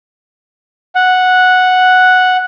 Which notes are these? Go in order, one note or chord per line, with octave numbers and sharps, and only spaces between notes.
F#5